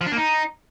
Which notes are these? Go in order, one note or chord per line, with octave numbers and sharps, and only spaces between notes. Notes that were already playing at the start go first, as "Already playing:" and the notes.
F3
D4
A#3
D#4